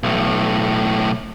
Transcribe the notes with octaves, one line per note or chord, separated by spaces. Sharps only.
B1 A2